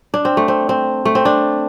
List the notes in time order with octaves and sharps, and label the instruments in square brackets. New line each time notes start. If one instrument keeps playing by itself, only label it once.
[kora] D4
C4
A3
C4
C4
A3
C4
D4